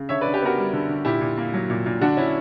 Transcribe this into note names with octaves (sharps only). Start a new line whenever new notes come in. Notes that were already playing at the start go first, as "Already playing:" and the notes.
Already playing: C#3
D3 C#5 E5
B4 D5
D3
G4 B4
B3 F#4 A#4
G3
D3
D3
A#2 E4 G4
A#2
A#3
F#3
A#2
A#2
D3 D4 F#4
D3 C#4 E4